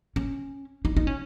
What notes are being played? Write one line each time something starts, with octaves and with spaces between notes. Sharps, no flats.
C#4
D#4
D#4
C#4